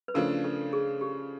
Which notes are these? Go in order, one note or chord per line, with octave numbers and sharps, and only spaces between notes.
B4
C#3 F3 A3 D4 A#4
A4
G#4
G4